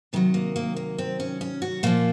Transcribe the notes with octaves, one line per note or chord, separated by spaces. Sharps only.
C3 D#3 F#3 A#3
A#3
A#3
A#3
C4
C#4
C#4
F#4
A#2 F3 A#3